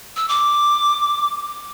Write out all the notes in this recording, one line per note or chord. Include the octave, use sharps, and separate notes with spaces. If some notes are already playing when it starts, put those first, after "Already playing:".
E6
D6